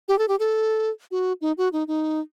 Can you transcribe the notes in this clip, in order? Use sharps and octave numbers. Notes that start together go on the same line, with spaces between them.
G4
A4
G4
A4
F#4
D#4
F#4
D#4
D#4